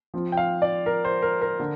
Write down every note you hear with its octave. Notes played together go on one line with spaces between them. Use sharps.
F3 C4 F4
G5
F5
D5
A#4
C5
A#4
A#4
D3